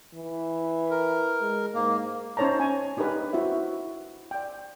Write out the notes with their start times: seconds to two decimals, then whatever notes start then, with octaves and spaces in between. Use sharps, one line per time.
0.14 E3
0.91 A#4
1.41 G#3
1.74 G#2 A#3
2.37 C#4 D#4 C5 C#5 A5 A#5
2.60 G#5
2.97 D4 D#4 G4 A#4 B4 D#5
3.33 E4 F#4 C5 E5
4.31 D5 G5